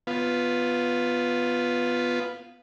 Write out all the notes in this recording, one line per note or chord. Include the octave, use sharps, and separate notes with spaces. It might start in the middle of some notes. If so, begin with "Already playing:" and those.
B3 F4